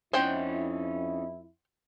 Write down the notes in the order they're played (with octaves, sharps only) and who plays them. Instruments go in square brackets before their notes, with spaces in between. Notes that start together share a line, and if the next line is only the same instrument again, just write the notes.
[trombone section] F2 E4 [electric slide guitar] C#4 D#4 [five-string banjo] C5 F#5 G5